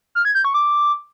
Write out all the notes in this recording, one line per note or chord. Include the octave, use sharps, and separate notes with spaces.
F6
G#6
G6
C#6
D6